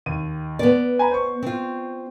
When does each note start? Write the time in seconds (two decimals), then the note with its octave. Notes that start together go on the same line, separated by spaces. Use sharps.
0.06 D#2 D#7
0.59 B3 D5
0.99 G#5 A#5 B5
1.11 C5 C#6
1.43 C4 F4